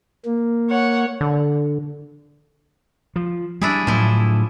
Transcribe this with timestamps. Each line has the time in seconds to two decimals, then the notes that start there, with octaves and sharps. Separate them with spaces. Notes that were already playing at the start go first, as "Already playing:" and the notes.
0.25 A#3
0.70 C#5 F#5
1.21 D3
3.16 F3
3.61 G3 D4 E4 G#4
3.87 A2 F3 F#3 E4